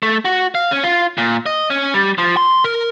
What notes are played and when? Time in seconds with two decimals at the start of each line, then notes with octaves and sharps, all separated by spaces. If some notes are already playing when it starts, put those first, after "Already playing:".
0.03 A3
0.25 F#4
0.55 F5
0.71 C#4
0.83 F4
1.18 A#2
1.46 D#5
1.70 C#4
1.94 G3
2.18 F3
2.37 C6
2.64 A#4